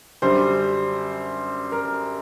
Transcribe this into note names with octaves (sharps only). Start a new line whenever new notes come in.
F#2 D3 G3 C5
A#4